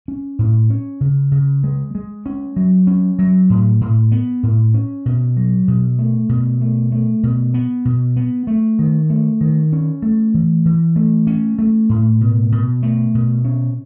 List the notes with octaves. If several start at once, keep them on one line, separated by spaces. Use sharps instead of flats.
C#4
A2
C#4
C#3
C#3
G#3
G#3
C#4
F#3
C#4
F#3
A2
A2
B3
A2
C#4
B2
F#3
B2
A3
B2
A3
A3
B2
B3
B2
B3
A3
D#3
A3
D#3
C#4
A3
E3
E3
A3
C#4
A3
A2
B2
B2
A3
B2
C#4